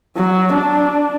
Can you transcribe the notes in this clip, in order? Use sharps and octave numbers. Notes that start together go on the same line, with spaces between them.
F#3
D4